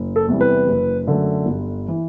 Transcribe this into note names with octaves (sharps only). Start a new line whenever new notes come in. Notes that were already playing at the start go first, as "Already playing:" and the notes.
Already playing: F#1
A4
E2 C3 E3 G3
B4
F#1
F#2 D3 A3
G1
E3